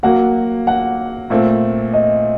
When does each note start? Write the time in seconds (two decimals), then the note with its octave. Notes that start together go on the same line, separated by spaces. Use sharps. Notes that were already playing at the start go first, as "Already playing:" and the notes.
0.03 F#3 A#3 F#4 F#5
0.67 F#5
1.30 A#2 A3 C4
1.93 D#5